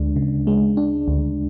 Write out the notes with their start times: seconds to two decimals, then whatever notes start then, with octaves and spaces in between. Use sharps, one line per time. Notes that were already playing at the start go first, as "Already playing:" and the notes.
Already playing: D2 G#3 D4
0.16 C#3
0.47 G#3
0.77 D4
1.08 D2